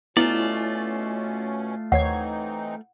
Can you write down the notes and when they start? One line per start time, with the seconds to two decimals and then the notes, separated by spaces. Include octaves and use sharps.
0.17 B2 A3 B3 C#4 E4 F4 D5
1.92 D#2 E3 C4 D#4 C#5 F#5 G#6